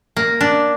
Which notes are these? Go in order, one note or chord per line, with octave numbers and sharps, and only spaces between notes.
A#3
D4